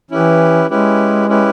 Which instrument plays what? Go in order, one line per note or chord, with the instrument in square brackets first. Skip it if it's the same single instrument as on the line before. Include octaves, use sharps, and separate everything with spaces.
[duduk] E3 [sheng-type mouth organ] C#4 E4 G4 B4
[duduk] G#3 [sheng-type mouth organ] C#4 E4 G4 B4
[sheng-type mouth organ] C#4 E4 G4 B4